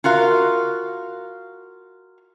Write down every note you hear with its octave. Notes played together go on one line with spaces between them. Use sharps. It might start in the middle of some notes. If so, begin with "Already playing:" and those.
F4 F#4 A#4 F5